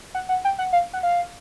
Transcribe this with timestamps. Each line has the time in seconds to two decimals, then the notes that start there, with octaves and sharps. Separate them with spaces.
0.14 F#5
0.29 F#5
0.45 G5
0.59 F#5
0.73 F5
0.93 F#5
1.03 F5